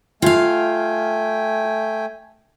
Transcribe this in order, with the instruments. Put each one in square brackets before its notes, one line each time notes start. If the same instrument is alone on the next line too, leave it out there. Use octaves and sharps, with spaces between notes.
[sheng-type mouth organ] A3 G5 G#5 [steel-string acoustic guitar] F4 F5